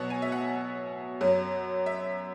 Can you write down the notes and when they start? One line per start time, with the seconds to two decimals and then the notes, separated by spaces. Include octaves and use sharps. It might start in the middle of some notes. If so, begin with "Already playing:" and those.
Already playing: B2 F#3 B3 F#5
0.10 G#5
0.22 E5
0.32 F#5
1.21 F#2 F#3 C#4
1.86 E5